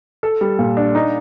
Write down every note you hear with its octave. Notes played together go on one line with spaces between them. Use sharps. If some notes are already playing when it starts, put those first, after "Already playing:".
A4
G3
A#2
D4
D#4